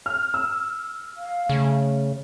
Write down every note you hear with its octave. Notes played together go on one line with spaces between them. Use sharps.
F6
E6
F5
C#3 A3